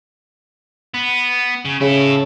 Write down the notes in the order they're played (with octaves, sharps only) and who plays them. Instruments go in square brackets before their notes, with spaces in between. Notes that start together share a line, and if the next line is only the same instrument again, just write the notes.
[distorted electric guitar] B3
C#3
[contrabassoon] C#3 [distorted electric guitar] E4 A4